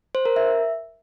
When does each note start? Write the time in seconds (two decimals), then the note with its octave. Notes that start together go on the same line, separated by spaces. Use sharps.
0.15 C5
0.25 A#4
0.36 E5